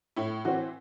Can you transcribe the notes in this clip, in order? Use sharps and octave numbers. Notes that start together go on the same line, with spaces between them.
A2 E4
E3 C4 F#4